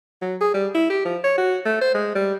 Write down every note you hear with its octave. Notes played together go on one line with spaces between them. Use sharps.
F#3
G#4
G3
E4
G4
F3
C#5
F#4
A3
C5
G#3
G3